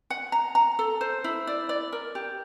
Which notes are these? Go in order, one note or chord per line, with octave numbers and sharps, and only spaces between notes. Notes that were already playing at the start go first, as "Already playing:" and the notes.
F#5
A#5
A#5
A4
C5
E4
D5
D5
A#4
G4